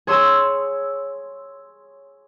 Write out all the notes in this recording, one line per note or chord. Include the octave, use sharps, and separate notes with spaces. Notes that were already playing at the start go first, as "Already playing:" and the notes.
G#4 C#5 C6 D#6 E6